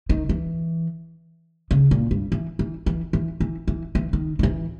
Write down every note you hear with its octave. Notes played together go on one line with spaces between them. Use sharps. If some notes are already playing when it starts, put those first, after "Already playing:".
D#3
E3
C#3
A#2
G2
E3
E3
E3
E3
E3
E3
E3
D#3
D#3
E3